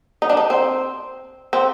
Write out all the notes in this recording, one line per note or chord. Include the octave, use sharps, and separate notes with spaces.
D#4
D4
D#4
C4
C4